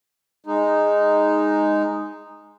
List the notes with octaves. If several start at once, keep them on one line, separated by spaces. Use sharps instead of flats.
G#3 D#4